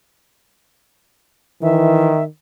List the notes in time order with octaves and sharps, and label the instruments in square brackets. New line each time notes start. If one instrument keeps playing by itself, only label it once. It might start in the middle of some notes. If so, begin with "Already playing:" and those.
[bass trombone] D#3 [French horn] E3 [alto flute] E5